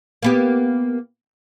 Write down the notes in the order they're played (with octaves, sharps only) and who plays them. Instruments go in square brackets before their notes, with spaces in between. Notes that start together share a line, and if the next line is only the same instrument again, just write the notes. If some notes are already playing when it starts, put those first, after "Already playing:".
[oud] A#3 B3 G4